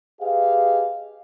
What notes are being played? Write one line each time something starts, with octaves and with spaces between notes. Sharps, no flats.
G4 G#4 B4 D#5 F5